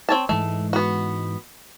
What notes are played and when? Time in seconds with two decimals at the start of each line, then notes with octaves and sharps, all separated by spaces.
0.09 C4 C#5 A5
0.29 G#2 E3 G#3 A3
0.73 B3 F#4